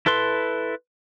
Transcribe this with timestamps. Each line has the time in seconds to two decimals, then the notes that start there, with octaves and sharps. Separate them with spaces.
0.06 E4 A4 B4 C6